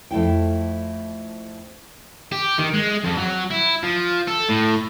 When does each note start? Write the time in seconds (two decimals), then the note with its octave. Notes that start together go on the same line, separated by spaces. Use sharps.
0.11 F2 A3 E4 G5
2.32 G4
2.58 D#3
2.74 G#3
3.04 F2
3.18 F#3
3.50 E4
3.83 F3
4.28 A4
4.49 A2